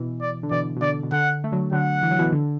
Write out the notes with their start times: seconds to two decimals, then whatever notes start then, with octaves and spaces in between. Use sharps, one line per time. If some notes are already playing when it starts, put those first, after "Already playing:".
Already playing: B2 E3
0.21 D5
0.43 D3
0.51 B2 E3 D5
0.76 B2
0.81 D3 D5
1.03 B2
1.12 D3 F#5
1.44 A3
1.52 D3 F#3
1.72 D3 F#3 F#5
2.03 E3
2.11 F#3
2.19 B2 E3
2.32 D3